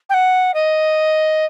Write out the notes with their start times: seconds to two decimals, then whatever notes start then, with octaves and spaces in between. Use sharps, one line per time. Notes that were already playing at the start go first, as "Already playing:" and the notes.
0.10 G5
0.14 F#5
0.54 D#5